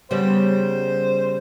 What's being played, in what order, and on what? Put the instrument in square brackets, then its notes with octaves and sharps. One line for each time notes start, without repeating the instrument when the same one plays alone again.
[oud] C#3 G3 B3 [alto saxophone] C5